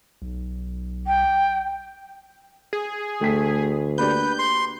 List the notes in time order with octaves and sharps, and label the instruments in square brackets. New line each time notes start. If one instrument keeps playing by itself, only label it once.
[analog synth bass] B1
[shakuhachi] G5
[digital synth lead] G#4
[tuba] D2 [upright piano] A3 G5 B6
[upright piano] A#3 D4 G4 [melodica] B4 [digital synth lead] G6
[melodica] C6